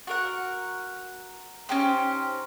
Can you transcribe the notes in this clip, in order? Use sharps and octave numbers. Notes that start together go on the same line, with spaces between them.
F#4 A#4 F#5
C#4 D#4 G4 C5